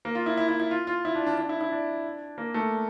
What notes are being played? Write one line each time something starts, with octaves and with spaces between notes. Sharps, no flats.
A#3
F4
E4
E4
E4
E4
F4
F4
E4
D4
D4
D4
E4
E4
D4
A#3
A3